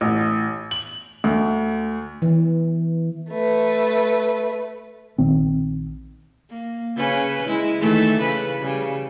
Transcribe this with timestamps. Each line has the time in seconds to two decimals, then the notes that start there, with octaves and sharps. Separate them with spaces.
0.01 A1
0.71 F#7
1.24 D2
2.22 E3
3.32 A3 B4
5.18 A#1 D#3 C4
6.50 A#3
6.96 C#3 C#4 B4
7.47 G#3 E4
7.78 D#3 E3 A3
8.19 C#3 B4
8.61 C#3 G3